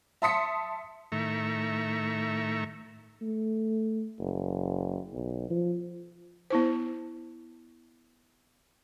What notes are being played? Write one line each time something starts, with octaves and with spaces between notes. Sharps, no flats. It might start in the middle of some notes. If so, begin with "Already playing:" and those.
E5 A5 C6 D#6 B6 C#7
A2 D#3 A3 E5 A#5 C#6
A3
F#1
B1
F3
B3 E4 C5